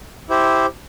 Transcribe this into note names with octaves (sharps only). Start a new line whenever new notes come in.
E4 G4 C5